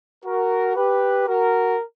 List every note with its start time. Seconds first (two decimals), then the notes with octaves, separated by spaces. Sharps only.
0.25 F#4 A#4
0.76 G4 B4
1.28 F#4 A#4